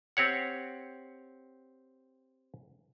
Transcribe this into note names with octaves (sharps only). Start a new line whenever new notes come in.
C4 G4 C#5 F#5